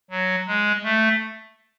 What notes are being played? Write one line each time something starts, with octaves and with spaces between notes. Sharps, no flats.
F#3
G#3
A3